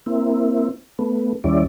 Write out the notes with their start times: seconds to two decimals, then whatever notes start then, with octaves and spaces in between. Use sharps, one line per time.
0.06 A#3 C4 E4
0.99 A3 B3
1.44 D#2 G3 C#4 E4 D5